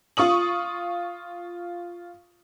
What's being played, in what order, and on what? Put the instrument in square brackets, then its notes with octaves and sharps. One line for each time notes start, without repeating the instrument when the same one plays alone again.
[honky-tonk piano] F4 C#6 D#6 F#7